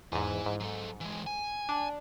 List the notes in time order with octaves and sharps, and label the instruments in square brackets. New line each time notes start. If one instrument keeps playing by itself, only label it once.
[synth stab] E2 G#2 [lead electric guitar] E4 G#5
[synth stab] G#2
[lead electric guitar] F#3 A4
E3 G#3
G#5
[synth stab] D4